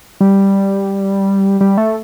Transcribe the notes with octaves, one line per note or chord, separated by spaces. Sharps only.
G3
G3
A3